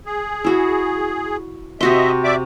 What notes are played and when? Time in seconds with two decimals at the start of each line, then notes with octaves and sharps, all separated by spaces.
0.06 G#4
0.44 E4 F#4
1.81 C3 F#4 D#5 E5 C6
2.24 D5 E5 D6